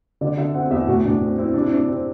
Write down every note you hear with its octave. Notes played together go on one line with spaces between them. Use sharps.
D3 D5
D3 E5
C4 F#5
E2 E5
A2 F#4
A2 D4
C4
C4 E4
C3 D4
E4
C3 D4
C4